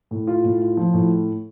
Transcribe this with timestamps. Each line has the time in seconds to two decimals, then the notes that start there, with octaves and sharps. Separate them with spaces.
0.11 A2
0.27 F4
0.44 A2
0.61 F4
0.77 F3
0.93 A2